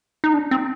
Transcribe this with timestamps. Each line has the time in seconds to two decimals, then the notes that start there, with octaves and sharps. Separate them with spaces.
0.24 D#4
0.34 D4
0.51 C4